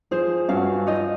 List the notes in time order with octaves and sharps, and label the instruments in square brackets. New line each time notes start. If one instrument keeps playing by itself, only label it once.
[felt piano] F3 [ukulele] G#4 C5
[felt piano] G2 C#4 F#4 [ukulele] F5
[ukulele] D#4 F4 D#5